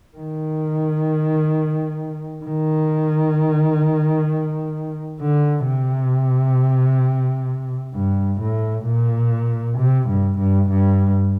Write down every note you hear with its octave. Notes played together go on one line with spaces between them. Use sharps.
D#3
D#3
D3
C3
G2
A2
A#2
C3
G2
G2
G2